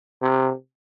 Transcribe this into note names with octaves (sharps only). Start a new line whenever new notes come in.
C3